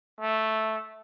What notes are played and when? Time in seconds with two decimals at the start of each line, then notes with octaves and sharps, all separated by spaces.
0.20 A3